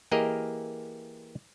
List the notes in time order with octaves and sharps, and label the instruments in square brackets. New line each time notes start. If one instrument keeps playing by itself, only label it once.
[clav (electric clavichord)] E3 A#3 G4 G#4 A#4 D#5